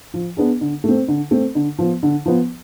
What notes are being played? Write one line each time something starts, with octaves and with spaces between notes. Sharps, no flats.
F3
B3 D4 G#4
D3
A3 C4
D3
A3 C4
D3
F3 B3
D3
F3 B3